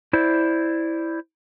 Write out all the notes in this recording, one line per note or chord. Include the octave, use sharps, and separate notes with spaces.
E4 C5 D5